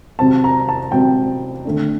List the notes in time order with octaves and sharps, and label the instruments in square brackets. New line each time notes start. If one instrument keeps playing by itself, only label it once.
[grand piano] C3 F#3 C4 A5
A#5
A5
C3 F#3 C4 G5
D3 A3 D4